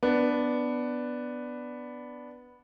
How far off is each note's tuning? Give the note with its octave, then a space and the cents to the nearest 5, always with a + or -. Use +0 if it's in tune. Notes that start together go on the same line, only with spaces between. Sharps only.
B3 +0 D4 +0